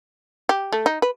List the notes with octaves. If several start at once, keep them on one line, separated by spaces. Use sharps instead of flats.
G4
A3
D#4
B4